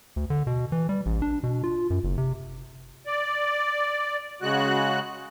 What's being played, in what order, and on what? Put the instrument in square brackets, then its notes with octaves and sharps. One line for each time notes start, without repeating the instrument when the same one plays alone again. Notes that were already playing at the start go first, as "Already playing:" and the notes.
[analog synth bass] D2
D3
B2
E3
G3
A1
D4
B2
F4
F#2
F#1
C3
[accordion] D5
C#3 G#3 F#4 F#6